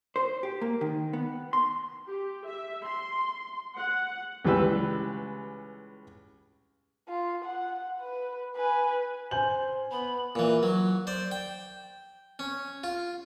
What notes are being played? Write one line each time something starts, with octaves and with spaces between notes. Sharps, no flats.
C5
G4
A#3
D#3
B3
C6
G4
E5
C6
F#5
C#2 E3 G3 B4 G5 E6
F4
F#5
B4
B4 G#5
C5 G#5 G6 F#7
B3 B5
A#2 E3
F#3
C5 D5
G5
C#4
F4